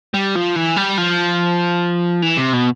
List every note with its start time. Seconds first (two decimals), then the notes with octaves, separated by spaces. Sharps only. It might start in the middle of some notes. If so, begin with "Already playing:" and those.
0.14 G3
0.36 F3
0.56 E3
0.76 G3
0.98 F3
2.22 E3
2.37 C3
2.53 B2